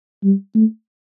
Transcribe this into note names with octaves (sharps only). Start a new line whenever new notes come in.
G3
A3